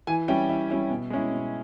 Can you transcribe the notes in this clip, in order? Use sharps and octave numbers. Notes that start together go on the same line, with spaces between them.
E3 G#5
G3 C#4 E4 G5
E3 E5
G3 C#4 E4
B2
G#3 C#4 E4
B2